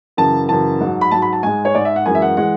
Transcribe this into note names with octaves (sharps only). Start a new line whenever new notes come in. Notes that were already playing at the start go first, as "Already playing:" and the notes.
F#2 C#3 E3 A5
F#2 C#3 E3 A5
G#2 F#3
B5
G#2 F#3 A5
B5
A5
G#2 G#3 G#5
C#5
G#2 G#3 D5
E5
F#5
F#2 E3 G#3 G#5
E5
F#5
E3 G#3 F#5